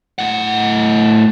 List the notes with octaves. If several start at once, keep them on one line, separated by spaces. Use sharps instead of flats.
A2 F#5